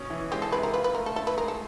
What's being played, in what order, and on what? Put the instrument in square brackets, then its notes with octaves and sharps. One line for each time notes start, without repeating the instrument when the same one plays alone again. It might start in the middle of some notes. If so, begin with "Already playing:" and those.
Already playing: [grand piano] B2 C#4
E3
[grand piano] G#3 [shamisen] G4
[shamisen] A4
[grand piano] C3 [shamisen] B4
[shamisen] A#4
[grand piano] F4 [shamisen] B4
[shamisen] B4
[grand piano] A3 [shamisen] A#4
[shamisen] A4
[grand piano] E4 [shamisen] A4
[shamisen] B4
[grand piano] G#3 [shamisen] A#4
[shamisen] A4